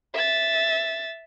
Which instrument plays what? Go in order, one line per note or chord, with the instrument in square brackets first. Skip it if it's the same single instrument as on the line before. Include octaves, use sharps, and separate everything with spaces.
[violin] E5 A6